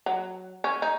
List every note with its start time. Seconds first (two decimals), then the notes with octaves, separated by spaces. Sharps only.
0.06 F#3
0.64 C#4
0.82 D#4